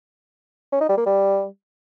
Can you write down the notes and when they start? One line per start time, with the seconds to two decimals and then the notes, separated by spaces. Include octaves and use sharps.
0.72 C#4
0.81 D#4
0.89 G3
0.98 A#3
1.06 G3